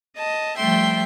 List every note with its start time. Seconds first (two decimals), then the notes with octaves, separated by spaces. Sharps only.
0.17 D#5 A5
0.57 F3 G3 A3 E5 G5 C6